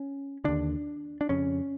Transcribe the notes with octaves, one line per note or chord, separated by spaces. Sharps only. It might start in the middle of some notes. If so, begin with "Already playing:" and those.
Already playing: C#4
D#2 D3 D4
D4
F2 C#3 C#4